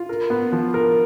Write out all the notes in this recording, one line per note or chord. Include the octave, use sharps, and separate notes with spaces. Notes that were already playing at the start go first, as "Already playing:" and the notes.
Already playing: F4
A#4
B3
F3
A#4